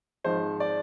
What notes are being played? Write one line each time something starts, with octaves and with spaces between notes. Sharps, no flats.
G#1 G#2 F3 G#3 C5
D5